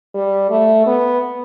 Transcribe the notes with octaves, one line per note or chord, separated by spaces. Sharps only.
G3
A3
B3